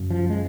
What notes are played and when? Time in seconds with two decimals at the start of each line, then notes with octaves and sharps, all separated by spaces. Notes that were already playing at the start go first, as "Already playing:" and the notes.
Already playing: F#2 C#3
0.10 F3
0.29 G#3